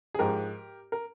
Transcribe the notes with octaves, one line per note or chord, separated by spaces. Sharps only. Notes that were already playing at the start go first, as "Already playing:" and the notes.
G#4
G#2 F3 G#3 G4 A#4
A#4